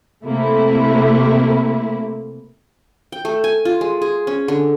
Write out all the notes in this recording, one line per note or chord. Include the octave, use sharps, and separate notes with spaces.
C3 A3 A#3 E4
G5
A3
G#5
F4
G#3
G#4
C#4
D3